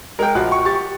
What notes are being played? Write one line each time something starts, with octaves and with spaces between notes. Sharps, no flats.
G#3 A#4 G5
A#1 F4 F#4 F#6
C#6
G4 C#6 A6